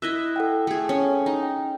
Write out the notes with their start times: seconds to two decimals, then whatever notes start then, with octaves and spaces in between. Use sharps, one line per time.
0.02 E4 D#5 E5 E6 F#6
0.36 A4 F#5 G5
0.67 A3 G#4
0.89 C#4
1.26 D#4
1.43 G5